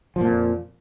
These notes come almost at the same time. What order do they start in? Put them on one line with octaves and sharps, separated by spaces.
F3 A#2 F2